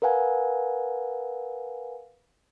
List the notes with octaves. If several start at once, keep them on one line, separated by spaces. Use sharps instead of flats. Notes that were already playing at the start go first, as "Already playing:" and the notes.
A#4 B4 F5 F#5 G#5